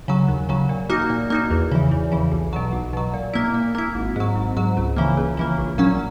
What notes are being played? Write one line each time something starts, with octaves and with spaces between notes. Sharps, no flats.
C#3 F#3
D#2
C#3 F#3
A#2
A#3 D#4 F#4
A#2
A#3 D#4 F#4
E2
C#3 E3
E2
C#3 E3
B1
B2 F#3
B1
B2 F#3
A#2
A#3 E4
A#2
A#3 E4
G#1
G#2 F#3
G#1
G#2 F#3
C#2
C#3 E3 A#3
C#2
C#3 E3 A#3
A#1
A#2 F#3 C#4